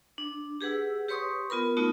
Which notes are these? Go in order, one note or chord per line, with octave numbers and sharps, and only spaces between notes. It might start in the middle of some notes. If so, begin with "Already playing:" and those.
D4
G4 G#4 B4 F#5 E6
G4 B4 C#5 C6 C#6 D#6
B3 F4 A#4 B5
A3 B3 D#4 F4 F#4